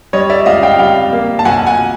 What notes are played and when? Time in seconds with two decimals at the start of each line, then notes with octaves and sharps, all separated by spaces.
0.13 G3 C#5 D#5
0.30 D5 E5
0.46 C#2 D#5 F5
0.63 F5 G5
0.79 G3 F5 G5
1.13 A#3
1.39 A5
1.45 B1 F#5 G#5
1.66 F#5 G#5